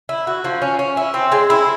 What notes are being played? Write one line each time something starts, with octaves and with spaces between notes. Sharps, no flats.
E4
F#4
F3
C#4
C#4
E4
C4
G#3
E4